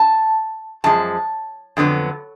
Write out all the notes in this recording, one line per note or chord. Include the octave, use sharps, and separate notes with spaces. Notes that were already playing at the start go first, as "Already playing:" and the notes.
Already playing: A5
F#2 F3 G#3 A5
F2 D3 F#3 B3